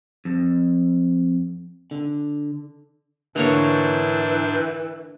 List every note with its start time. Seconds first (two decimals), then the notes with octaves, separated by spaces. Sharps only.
0.25 F2
1.91 D3
3.36 G#2 D3 E3 A#3 D4 C#5 G6